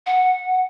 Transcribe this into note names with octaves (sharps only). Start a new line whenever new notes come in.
F#5